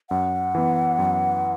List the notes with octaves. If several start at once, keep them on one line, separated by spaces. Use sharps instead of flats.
F#2 F#5
E3 B3
F#2